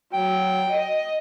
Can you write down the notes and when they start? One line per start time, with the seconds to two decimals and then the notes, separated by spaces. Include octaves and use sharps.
0.14 F#3 G5
0.69 D#5